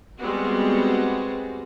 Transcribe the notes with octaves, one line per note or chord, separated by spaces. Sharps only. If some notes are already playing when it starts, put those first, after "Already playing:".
G3 G#3 B3 C4 F#4